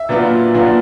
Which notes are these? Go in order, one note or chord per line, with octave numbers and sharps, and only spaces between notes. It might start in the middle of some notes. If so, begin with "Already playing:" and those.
Already playing: E5
A#2 F#3 B3 D4 F4
A#2 F#3 B3 D4 F4